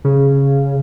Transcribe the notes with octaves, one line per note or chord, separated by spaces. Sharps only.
C#3